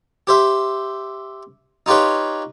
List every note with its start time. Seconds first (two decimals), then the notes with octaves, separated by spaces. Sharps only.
0.27 G4 C5 E5
1.86 D#4 F4 G4 B4 C#5